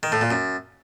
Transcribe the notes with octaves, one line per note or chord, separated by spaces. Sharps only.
D#3
A2
A#2
F#2